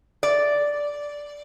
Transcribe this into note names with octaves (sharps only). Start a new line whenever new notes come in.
D5